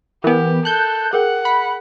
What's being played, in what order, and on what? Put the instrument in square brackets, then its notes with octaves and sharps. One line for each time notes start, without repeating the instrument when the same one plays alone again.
[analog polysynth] E3 B3 [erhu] G4 [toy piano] A#4 G#5
[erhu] A4 [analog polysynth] F#6 G6
[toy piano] G#4 A#4 G5 [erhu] F#5
[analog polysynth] B5